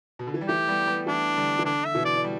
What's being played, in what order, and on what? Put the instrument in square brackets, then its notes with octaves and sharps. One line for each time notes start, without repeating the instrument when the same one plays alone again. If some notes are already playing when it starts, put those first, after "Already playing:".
[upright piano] B2
D3
E3
G3
[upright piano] E3 A3 [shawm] G4
[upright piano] G3 B3
G3 B3
[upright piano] E3 A3 [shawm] D4
[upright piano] D3 G3
E3
[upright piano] D3 [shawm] D4
[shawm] E5
[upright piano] B2 E3
[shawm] D5
[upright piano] D4
G3